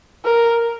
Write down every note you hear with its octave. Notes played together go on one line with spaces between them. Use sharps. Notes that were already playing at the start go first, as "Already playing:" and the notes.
A#4